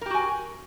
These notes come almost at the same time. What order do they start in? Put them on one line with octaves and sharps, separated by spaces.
A#4 G4 F#4 G#5